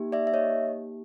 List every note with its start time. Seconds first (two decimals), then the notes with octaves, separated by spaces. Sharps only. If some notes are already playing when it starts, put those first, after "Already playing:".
Already playing: A#3 D#4 G4
0.12 D5 E5
0.27 E5
0.33 C#5 D#5